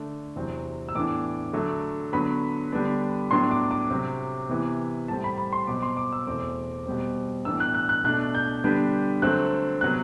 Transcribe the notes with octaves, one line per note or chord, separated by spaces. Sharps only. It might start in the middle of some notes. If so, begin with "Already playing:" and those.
Already playing: D3 A3 D4
E2 C3 F#3 C4
E6
A2 E3 B3 D4 D6
D3 F#3 A3
D3 F#3 B3 B5
D3 G3 B3 D4
A2 F#3 B3 D4 C6
D6
D6
C3 F#3 C4
C3 E3 B3
A2 G3 C4 A5
B5
B5
C6
B2 F#3 C4 D6
C6
D6
E6
E2 B2 A3 C4 D6
B2 G3 C4
A2 E3 B3 D4 E6
F#6
F#6
F#6
B2 A3 D4 F#6
G6
D3 G3 B3 D4
D3 F#3 A3 C4 F#6
C3 F#3 B3 F#6